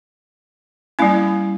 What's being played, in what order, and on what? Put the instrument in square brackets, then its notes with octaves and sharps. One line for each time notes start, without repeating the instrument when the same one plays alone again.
[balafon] G3 A#3 C#4 E4